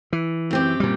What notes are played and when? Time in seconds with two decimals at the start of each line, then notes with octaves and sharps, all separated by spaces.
0.13 E3
0.51 F#2 C4 G4
0.80 A#2 G3